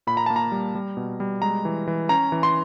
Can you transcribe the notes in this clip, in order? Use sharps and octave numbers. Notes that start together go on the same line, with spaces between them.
A#2 B5
A#5
A#3 A5
A#5
G3
G3
B2
G3
G#3 A#5
E3
E3
C#4 A#5
E3
C6